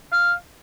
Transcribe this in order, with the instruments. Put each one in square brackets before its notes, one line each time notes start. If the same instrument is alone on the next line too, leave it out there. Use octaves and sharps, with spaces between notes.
[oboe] F5